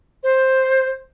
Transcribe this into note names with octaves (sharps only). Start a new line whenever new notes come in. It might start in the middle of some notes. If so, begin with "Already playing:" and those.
C5